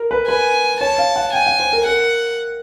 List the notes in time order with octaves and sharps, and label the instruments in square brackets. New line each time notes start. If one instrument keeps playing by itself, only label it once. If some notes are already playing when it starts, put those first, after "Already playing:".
Already playing: [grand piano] A#4
B4
[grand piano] B4 [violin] G#5
[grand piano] C#5 [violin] A5
[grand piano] F5
F#5
[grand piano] G5 [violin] G#5
[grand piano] F#5
C5
A#4
[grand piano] A#4 [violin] F#5